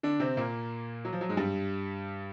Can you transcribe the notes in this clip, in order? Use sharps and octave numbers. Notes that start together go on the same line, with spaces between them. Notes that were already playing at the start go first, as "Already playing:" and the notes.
D3 D4
C3 C4
A#2 A#3
F#3
F3
F#3
G#2 G#3
G2 G3